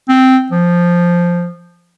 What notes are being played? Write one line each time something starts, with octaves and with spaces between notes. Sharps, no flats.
C4
F3